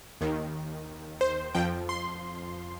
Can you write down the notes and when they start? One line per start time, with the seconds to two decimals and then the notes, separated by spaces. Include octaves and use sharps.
0.21 D#2 D#3
1.21 C5
1.55 F2 F3 G5
1.89 C6